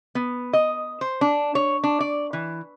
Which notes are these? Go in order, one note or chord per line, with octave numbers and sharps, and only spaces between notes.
B3
D#5
C5
D4
C#5
D4
D5
E3